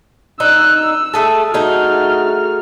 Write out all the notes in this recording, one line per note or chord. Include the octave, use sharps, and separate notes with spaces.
D#4 E6 F#6
E6
A3 G#4 A4
A3 D#4 F#4 G#4 F6